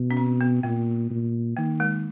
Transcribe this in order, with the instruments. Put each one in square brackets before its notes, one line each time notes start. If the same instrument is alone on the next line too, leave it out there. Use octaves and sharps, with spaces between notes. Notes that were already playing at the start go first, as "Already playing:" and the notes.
Already playing: [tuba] B2
[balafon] C#4
C4
B3
[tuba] A#2 [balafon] A#3
[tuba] A#2
[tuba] D#3 [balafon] A#3
[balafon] G#3